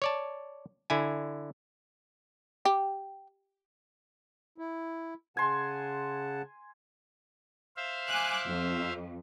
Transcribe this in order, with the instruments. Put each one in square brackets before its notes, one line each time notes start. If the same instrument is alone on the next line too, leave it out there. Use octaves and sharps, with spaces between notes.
[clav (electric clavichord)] C#5 D5 A5
D3 E4 G#5
[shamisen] G4
[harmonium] E4
[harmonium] C#3 F#5 A5 [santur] G#5 C6
[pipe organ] C5 E5 F5
[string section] G#5 D6 F#6
F2